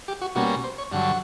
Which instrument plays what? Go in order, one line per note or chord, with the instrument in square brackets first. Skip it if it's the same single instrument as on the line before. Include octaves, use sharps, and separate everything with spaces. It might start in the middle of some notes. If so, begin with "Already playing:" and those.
[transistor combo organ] G4
F#4
B2 G3 A#3 C#4 F#4
C5
C#5
G2 D3 F#3 F#5